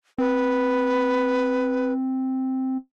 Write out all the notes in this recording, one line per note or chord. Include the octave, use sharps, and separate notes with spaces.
C4 B4